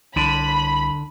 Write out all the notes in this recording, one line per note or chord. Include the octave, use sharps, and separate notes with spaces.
C2 D3 B5